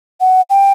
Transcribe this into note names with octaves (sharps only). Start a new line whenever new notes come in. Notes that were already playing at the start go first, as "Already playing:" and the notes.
F#5
G5